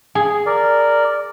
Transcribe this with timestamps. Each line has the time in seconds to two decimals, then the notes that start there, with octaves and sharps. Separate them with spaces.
0.15 G#4
0.46 A#4 D5